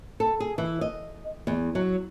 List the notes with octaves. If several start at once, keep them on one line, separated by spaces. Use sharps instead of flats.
A4
G#4
E3
D#5
E2
F#3